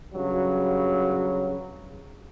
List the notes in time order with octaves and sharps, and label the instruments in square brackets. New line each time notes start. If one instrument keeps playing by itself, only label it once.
[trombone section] G2 C#3 F#3